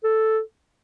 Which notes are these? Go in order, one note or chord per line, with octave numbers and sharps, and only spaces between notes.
A4